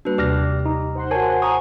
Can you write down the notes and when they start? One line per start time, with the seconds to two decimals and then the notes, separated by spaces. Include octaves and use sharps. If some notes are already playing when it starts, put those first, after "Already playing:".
0.05 G3 A#3 D4 F#4 B4
0.18 D#2 C3 G4 D5 F6 A#6
0.66 D#4
0.95 C5 F#5 C6
1.11 F#4 A#4 C#5 G#5 A5
1.42 G#5 A#5 C#6 D#6